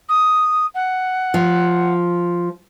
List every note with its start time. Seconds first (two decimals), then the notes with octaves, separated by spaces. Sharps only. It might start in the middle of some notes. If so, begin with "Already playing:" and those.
0.09 D#6
0.74 F#5
1.34 F3